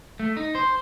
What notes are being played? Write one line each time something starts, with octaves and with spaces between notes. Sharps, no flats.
A3
D#4
C5